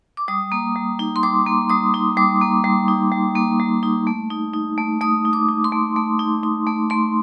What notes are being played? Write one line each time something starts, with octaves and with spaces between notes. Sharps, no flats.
D6
G3 D#6
A#3
G3
D#4
C6
G3 D6
A#3
G3 D#6
D#4
G3 D6
A#3
G3
D#4
G3
A#3
G3
D#4
A3
D#4
D#4
A3
A3 D#6
D#4
D6
D#4
C6
A3
A3
D#4
D#4
A3
A3 C6